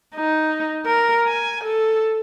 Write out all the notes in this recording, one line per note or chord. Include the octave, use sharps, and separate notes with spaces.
D#4
A#4
G#5
A4